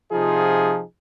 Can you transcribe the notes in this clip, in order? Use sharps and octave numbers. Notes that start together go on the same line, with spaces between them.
C3 F3 D#4 F4 G#4